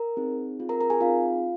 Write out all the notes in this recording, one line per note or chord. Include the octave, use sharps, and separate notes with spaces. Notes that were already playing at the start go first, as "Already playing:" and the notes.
Already playing: A#4 A#5
C4 D#4 G#4
C4 F4 G#4
A#4 A#5
A#4 A#5
G#4 G#5
C4 D#4 F4 G#4 F5